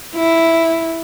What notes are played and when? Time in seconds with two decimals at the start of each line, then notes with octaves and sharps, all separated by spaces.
0.15 E4